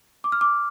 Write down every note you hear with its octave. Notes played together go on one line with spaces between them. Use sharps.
D6
F6
D6